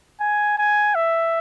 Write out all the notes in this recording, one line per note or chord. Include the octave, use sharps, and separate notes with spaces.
G#5
G#5
E5